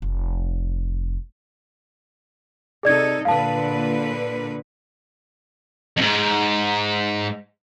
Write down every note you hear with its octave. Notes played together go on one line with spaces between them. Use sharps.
F1
C3 D#4 G#4 A4 D5 G#6
A#2 D3 B4 F5 A5
F2 G#2